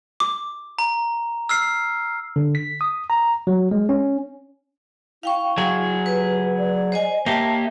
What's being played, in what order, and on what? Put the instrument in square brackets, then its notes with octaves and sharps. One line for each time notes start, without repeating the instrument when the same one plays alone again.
[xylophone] D6
[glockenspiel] A#5
E6 F6 C7
[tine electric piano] D3
B6
D#6
A#5
F#3
G#3
C#4
[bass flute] E4 [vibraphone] F5 G5 C#6
[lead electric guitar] F#3 G#4
[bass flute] G4 [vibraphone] B4
[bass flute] D5
[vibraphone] C5 D#5 G#5
[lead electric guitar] A#3 G4 [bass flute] E5 [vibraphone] A5